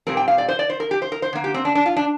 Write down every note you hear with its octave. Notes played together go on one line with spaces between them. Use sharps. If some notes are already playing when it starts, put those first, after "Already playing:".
A#2 G3 C4 A#4
G5
F5
D5
C5
D5
C5
A#4
G4
C5
A#4
C5
D3 A#3
G4
C4
D4
D4
F4
D4